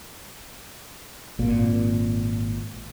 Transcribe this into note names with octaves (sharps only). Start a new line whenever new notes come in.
G#1 A#2